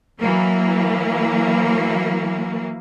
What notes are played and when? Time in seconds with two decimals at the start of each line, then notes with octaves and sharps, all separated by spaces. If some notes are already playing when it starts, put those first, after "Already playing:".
0.20 E3 F#3 A#3